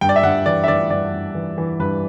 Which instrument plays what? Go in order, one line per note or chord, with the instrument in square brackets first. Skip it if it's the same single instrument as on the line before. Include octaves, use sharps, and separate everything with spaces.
[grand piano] G2 G5
D5
E5
G2 F#5
E3 D5
E5
E3 D5
G2 D5
G2
E3
E3
G2 B4